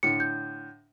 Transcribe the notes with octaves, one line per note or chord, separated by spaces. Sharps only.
A2 D3 C#7
G6